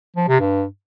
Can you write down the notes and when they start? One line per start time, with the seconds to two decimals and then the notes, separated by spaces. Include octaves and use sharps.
0.17 F3
0.28 C3
0.40 G2